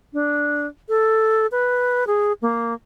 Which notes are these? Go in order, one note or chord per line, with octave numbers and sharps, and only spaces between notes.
D4
A4
B4
G#4
A#3